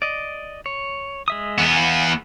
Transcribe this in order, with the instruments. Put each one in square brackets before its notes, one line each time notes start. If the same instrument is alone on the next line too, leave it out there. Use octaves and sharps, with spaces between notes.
[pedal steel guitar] D5 D#5
C#5
G#3 E5 D#6
[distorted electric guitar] E2 B3
[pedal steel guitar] F5